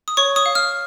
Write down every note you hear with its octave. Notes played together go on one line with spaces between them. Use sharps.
D#6
C#5 C#6
D#6
F5
F6